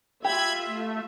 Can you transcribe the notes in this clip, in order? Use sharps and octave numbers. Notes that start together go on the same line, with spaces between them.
F4 G4 E5 B5 G#6
A3